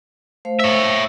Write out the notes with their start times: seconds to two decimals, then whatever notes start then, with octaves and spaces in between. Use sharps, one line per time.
0.45 A3 C5 F5
0.60 C#5 E5